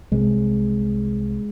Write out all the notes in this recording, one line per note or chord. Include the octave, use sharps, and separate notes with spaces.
C2 C3 G#3